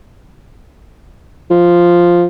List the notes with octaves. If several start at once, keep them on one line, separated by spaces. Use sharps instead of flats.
F3